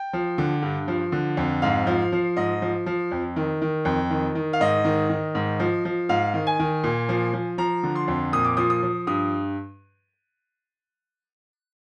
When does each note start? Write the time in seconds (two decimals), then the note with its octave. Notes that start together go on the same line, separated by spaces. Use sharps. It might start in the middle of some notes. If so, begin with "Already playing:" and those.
Already playing: G5
0.13 F3
0.38 D3
0.62 G2
0.88 F3
1.12 D3
1.37 F2
1.62 G#2 F5
1.87 F3
2.12 F3
2.37 G#2 D#5
2.62 F3
2.86 F3
3.11 F2
3.36 D#3
3.62 D#3
3.85 F2
4.10 D#3
4.35 D#3
4.53 F5
4.60 G#2 D#5
4.85 D#3
5.09 D#3
5.35 G#2
5.60 F3
5.85 F3
6.09 G#2 F5
6.34 D#3
6.47 G#5
6.59 D#3
6.84 A#2
7.09 F3
7.33 F3
7.58 F3 A#5
7.83 D3
7.95 C6
8.08 F2
8.33 A#2 D#6
8.45 D6
8.57 F3 D#6
8.70 D#6
8.83 F3
9.07 G2 D#6